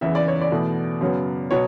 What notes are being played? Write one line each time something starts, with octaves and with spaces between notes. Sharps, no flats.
F#1 E2 C#3 E3 E5
D5
C#5
D5
E2 B2 A3
F#2 C#3 F#3 B3
B2 F#3 C#5